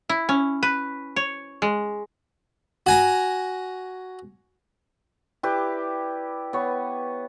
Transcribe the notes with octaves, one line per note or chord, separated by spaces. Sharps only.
E4
C#4
B4
C#5
G#3
F#4 G#5 A#5
E4 G4 B4 D5
B3 C#5